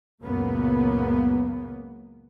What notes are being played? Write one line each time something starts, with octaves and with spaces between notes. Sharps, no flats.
C#2 F#2 A#2 C#3 A#3 B3